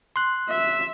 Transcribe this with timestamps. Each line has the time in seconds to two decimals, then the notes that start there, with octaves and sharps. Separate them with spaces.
0.16 C6 F#6
0.50 E5